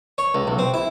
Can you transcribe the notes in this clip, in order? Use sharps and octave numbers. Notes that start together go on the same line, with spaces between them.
C#5
C#2
B1
C4
E4